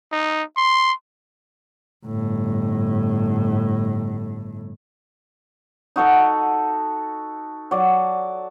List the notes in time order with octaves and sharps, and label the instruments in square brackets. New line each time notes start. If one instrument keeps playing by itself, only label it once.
[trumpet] D#4
C6
[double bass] G1 A2
[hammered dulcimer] D#4 F#4 A4 F#5
F#3 D5